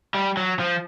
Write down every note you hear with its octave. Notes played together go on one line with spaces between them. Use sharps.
G3
F#3
F3